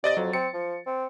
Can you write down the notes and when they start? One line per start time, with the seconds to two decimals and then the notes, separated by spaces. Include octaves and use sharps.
0.04 C3 D5 D#5 A6
0.17 F2 F#3
0.33 C4 C#7
0.54 F3
0.86 C4